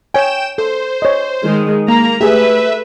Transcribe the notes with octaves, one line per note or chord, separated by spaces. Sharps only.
C#5 G5 G#5 E7
A4 C5
C#5 D#5
D#3 G#3
A#3 A#5
A3 G4 G#4 B4 E5